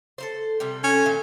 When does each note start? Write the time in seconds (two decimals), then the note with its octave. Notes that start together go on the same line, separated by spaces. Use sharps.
0.18 A4 A#4 C5
0.60 C3 G3 A4
0.84 C#4
1.06 A#2 D#3